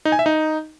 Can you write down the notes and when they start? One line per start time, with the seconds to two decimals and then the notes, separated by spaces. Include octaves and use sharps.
0.05 D#4
0.12 G#5
0.19 E5
0.26 D#4